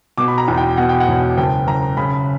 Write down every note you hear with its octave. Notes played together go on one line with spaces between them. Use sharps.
B2 D6
B5
A#5
E2
G5
B2 F#5
G5
F#5
E1
F#1 G5
F#1 A#5
C#3 B5